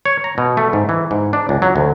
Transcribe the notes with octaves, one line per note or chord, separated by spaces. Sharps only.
C#5
A#5
B2
A3
G#2
E3
G#2
D4
C#2
F#3
D2